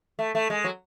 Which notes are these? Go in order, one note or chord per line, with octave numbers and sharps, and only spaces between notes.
A3
A3
G#3
F#3